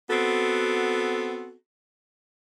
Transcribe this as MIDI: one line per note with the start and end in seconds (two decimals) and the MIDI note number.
0.10 1.54 59
0.10 1.54 60
0.10 1.54 66
0.10 1.54 69